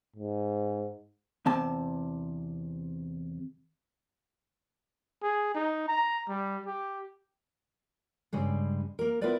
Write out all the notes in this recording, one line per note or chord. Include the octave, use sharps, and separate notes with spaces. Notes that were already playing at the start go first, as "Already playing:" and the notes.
G#2
E2 C3 A5
G#4
D#4
A#5
G3
G4
G2 C#3 G3 G#3
A#3 A#4
B3 E4 F4 A#4 B4 D5